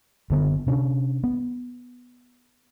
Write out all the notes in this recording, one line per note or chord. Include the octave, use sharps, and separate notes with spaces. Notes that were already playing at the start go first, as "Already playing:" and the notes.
F#1 D3 B3
C3 C#4 D4
B3